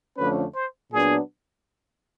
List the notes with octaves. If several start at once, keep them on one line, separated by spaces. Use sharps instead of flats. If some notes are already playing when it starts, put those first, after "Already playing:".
F2 D3 F3 A3 C#4 B4
C5
A#2 F#3 B3 D4 G#4